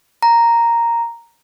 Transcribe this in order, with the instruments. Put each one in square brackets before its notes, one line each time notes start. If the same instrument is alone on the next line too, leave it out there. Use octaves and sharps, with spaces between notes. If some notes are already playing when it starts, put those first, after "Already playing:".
[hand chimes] A#5